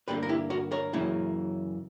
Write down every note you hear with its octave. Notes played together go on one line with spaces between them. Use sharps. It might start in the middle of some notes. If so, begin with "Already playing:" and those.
G2 D3 A#3 G4 B4
A#4
E4 G4
F#4 A#4
A#4 C#5
F#2 C#3 E3 A#3